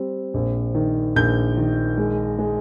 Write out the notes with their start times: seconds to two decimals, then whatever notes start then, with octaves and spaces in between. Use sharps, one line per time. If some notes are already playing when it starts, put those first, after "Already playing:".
Already playing: G3 C4
0.34 A#1
0.75 D#3
1.16 A#1 G6
1.57 D#3
1.97 G#3
2.39 G#3